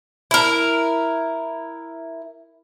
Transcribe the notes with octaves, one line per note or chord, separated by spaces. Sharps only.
E4 A#4